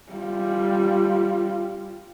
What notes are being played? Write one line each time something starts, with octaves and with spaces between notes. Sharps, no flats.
G3 F4